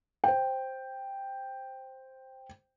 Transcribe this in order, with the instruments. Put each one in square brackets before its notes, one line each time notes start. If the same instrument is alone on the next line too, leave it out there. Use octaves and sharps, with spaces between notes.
[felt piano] C5 G5